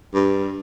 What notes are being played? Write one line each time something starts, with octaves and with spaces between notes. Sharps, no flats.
G2